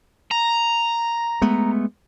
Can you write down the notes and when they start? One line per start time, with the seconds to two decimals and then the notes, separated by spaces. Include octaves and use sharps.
0.31 A#5
1.42 G#3 A3 B3